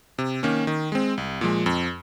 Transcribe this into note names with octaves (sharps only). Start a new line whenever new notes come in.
C3
D#3 A#3 C#4
D#3
G#3 C4
C2
A#2 F3 G#3
F2